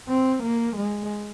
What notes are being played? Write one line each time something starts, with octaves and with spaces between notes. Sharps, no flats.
C4
A#3
G#3